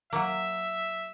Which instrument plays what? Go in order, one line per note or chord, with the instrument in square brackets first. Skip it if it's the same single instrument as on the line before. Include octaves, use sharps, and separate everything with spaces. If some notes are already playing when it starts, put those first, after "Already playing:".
[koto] F#3 A#3 [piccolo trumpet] E5